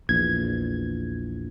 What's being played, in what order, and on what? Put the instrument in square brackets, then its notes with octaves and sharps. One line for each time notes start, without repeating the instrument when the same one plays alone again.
[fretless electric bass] A#1 E2 [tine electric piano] G#6